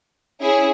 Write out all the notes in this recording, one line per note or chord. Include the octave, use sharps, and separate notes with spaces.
C#4 E4 G#4